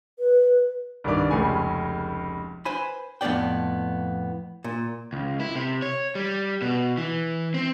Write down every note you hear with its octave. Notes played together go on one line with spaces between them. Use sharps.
B4
C2 G2 D#3 D4 D5 D6
F1 C#2 C#3 A3 G#5
B4 C5 G#5 B5
F2 A2 B3 D5 G5
A#2
C#2
E4
C3
C#5
G3
B2
E3
C4